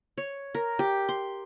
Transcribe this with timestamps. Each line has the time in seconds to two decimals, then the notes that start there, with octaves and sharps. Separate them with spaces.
0.18 C#5
0.55 A#4
0.79 G4
1.09 C6